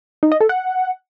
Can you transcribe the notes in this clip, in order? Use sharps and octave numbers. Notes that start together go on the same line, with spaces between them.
D#4
D#5
A4
F#5